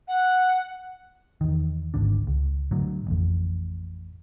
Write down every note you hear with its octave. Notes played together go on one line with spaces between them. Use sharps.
F#5
E2 D#3
G#1 D2 D4
C#2
A2 D3 F#3
A1 F2